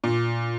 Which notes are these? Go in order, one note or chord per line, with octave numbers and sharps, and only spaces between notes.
A#2